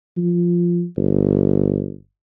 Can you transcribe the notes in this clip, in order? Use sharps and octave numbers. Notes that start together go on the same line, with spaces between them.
F3
G1